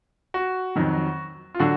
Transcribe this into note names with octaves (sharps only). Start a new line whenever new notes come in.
F#4
F2 D#3 F#3
F4
D3 F#3 F#4